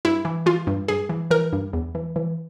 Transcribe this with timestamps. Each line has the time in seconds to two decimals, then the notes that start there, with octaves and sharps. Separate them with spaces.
0.05 G2 E4
0.25 E3
0.46 E3 F4
0.67 G2
0.88 G2 G#4
1.09 E3
1.31 E3 A#4
1.53 G2
1.73 E2
1.95 E3
2.16 E3